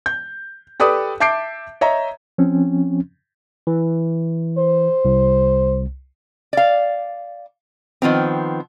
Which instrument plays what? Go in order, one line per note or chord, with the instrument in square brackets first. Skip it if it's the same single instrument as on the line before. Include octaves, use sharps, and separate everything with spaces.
[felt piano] G6
G4 A4 B4 D5 D#6
E5 A5 D6 G6 C7 D7
C#5 D#5 E5 A#5
[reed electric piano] F3 C4 C#4
[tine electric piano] E3
[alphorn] C5
[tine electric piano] C2
[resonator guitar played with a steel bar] D5 F5
D#3 F3 B3 C4